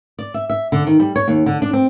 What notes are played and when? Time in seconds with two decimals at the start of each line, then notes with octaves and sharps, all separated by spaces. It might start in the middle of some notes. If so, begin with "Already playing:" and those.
0.19 D5
0.34 E5
0.50 E5
0.72 D3
0.87 D#3
1.00 G3
1.16 C#5
1.28 D#2
1.46 D3
1.62 D4
1.73 C4